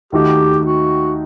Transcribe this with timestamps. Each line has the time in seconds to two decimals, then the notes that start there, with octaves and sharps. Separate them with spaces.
0.12 D#2 D#3 A3 D#4 F#4 G4
0.66 F#4